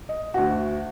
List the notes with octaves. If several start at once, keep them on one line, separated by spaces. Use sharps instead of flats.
D#5
D2 F#4